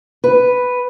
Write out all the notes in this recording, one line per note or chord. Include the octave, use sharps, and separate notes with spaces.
B4